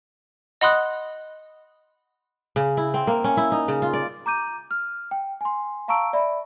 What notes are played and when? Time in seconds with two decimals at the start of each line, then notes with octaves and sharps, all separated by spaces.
0.61 D#5 F#5 B5 C6 D#6 F#6
2.56 C#3
2.77 E4
2.94 C4
3.07 A#3
3.24 C#4
3.37 E4
3.52 D#4
3.68 C#3
3.82 F4
3.93 D5
4.26 A#5 D6 G6 D#7
4.71 F6
5.11 G5
5.41 G#5 C6
5.88 F5 A5 A#5 C#6 E6 D7
6.13 D5 E5 B5